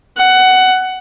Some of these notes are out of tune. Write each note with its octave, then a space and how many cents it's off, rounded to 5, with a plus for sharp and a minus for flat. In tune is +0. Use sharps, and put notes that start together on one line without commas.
F#5 +15